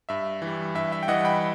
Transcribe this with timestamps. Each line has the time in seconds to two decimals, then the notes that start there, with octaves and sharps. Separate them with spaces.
0.09 G2 E5
0.42 E3
0.47 G3
0.75 G2 E5
0.92 E5
1.03 G5
1.08 E3 G3 D#5 F#5
1.25 G5 B5